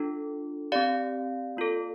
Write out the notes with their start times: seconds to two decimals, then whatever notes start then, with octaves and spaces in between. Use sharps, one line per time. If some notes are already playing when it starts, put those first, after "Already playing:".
Already playing: D4 F4 A4
0.72 C4 G4 D5 F5
1.57 A#3 F4 A4